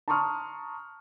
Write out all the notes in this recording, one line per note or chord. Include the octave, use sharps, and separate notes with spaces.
A5 A#5 C6 C#6 D#6 F6